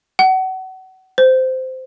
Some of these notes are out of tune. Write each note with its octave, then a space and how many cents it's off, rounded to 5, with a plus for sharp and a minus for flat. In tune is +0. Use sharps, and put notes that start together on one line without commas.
F#5 +30
C5 -15